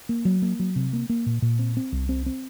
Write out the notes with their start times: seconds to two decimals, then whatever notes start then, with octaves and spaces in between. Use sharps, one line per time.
0.09 A#3
0.25 F#3
0.42 A#3
0.59 F#3
0.76 C3
0.93 A#3
1.10 A#3
1.26 A#2
1.42 A#2
1.59 C4
1.77 C4
1.92 C2
2.09 C4
2.26 C4